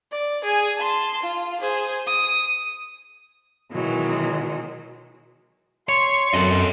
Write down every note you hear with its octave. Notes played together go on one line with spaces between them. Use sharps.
D5
G#4 G#5
A5 C6
F4
G#4 C5
D#6
B2 D#3 E3 F#3 G#3
C#5 C6
F#2 A4 D#5